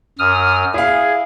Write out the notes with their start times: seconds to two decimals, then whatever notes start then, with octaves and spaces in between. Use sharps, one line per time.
0.19 F#2 D#6 F6
0.74 E4 G#4 F5